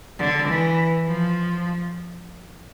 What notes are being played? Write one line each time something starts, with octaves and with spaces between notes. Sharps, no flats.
D3
E3
F3